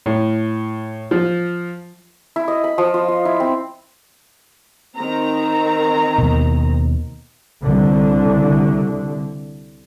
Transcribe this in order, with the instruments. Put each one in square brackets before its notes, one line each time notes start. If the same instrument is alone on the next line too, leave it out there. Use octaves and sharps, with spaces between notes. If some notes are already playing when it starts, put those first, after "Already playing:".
[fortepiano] A2
F3
[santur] E4
D#5
B5
F3
F4
F4
E4
C4
[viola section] D#3 C4 A#5
[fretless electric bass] D#2 B2
[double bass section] C2 D3